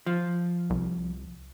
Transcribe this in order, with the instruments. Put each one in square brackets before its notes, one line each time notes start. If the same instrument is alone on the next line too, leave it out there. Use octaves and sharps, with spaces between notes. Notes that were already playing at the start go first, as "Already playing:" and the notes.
[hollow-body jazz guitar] F3
[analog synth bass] C2